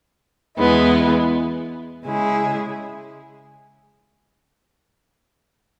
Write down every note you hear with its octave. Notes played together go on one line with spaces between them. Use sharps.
E2 E3 G#3 B3 E4
C#3 G#3 E4 G#4